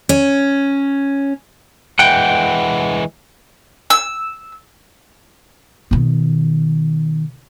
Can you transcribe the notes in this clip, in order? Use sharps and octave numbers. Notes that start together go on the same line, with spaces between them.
C#4
E3 G#3 F#5 G5
E6
B2 D#3